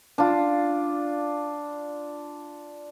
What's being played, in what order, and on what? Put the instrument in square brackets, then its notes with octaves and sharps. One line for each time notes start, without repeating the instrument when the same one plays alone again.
[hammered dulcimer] D4 F4